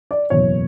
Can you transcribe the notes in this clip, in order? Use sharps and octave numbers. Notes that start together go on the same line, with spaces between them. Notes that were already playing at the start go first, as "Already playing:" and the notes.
D5
F#1 E2 B2 C#5